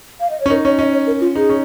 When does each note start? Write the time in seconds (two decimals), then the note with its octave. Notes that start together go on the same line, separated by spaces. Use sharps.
0.20 F5
0.30 D#5
0.40 C#5
0.46 C#4
0.50 D#4 A#4
0.65 C#4 C#5
0.79 C#4 D#5
0.92 C#5
1.07 A#4
1.21 F4
1.35 D#4 G#4
1.49 C#4